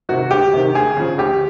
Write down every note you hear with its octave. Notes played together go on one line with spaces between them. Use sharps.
C3 D#3 F#4
D2 G4
C3 D#3
D2 G#4
C#3 F3
D2 G4